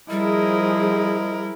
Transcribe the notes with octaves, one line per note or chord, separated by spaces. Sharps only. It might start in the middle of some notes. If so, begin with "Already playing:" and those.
F3 G3 E4 G#4 A#4 D#5